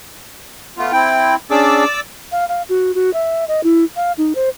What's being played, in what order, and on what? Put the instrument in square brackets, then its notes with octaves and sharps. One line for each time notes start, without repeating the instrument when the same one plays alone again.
[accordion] A3 B3 F4
[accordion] C4 E4 [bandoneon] G5
[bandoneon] C#4 D4 G#4 [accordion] D5 D6 E6
[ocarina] F5
F5
F#4
F#4
E5
D#5
E4
F5
D#4
C5